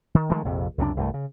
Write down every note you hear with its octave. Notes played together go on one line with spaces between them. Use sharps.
D#3
D#3 F3 G#3 A3
A#1 F2 C3
C#2 F#2 C3 D4
C2 G2 A3
C#3